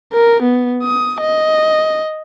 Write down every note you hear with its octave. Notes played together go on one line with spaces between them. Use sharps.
A#4
B3
D#6
D#5